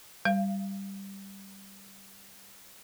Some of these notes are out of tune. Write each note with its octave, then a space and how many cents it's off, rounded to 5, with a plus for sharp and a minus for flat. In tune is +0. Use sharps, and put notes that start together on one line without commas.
G3 +0 F5 -20